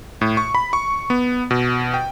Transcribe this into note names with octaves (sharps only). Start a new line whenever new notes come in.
A2
C#6
B5
C#6
B3
B2
G5